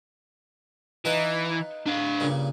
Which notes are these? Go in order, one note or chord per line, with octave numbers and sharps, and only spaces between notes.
E3 D#4 F4 B4
D4 F5
G2 A#2 C#3